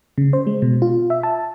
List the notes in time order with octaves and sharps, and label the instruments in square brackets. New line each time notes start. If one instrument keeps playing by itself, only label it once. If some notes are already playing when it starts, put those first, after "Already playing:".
[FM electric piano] C#3
C5
G#3
B2
F4
E5
A5